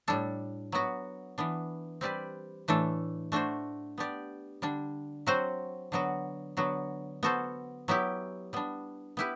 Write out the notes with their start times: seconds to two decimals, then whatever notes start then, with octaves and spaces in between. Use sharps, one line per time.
0.08 A2 G3 D4 A4
0.72 F#3 B3 F#4
1.38 E3 B3 D4
2.01 G3 C4 G4 B4 D5
2.68 A2 E3 A3 D4 A4
3.32 A3 D4 F#4 C5
3.98 B3 D4 G4 D5
4.62 D3 G3 D4
5.27 F#3 C4 F#4 C5
5.92 D3 F#3 B3 F#4
6.57 D3 F#3 B3 F#4
7.23 B3 F#4 A4 C5
7.88 F#3 B3 E4 G4
8.53 G3 B3 D4
9.17 B3 E4 G4 B4